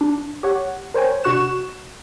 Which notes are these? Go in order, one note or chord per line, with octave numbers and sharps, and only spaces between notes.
D4
G4 C#5 F#5
A#4 C5 C#5 G5 G#5
C3 D4 F#4 C#6 F#6 E7